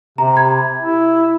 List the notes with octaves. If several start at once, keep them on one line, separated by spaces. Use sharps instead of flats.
C3 A#5
B5 G#6
E4